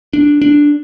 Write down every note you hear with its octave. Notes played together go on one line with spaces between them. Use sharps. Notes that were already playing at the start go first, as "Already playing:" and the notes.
D4
D4